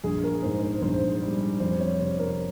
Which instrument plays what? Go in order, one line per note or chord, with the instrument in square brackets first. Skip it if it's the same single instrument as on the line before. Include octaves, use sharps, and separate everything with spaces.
[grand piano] A#1 G#4
A#4
G#2 C5
C5
A#1 C5
G3
F2 C5
C#5
C3 C5
A#4